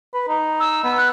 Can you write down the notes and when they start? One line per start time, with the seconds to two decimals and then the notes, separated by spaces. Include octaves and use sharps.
0.14 B4
0.28 D#4
0.60 E6
0.84 B3
0.97 F#6